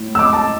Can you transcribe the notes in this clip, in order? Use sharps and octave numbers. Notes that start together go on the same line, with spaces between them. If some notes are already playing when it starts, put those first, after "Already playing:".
Already playing: A2
E6
D6
A5